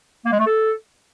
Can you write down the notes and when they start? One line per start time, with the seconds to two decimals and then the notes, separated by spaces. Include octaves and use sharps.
0.25 A#3
0.32 G#3
0.39 A3
0.47 A4